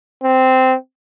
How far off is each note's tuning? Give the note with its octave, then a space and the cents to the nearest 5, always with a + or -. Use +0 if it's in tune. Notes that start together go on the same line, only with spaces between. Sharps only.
C4 -10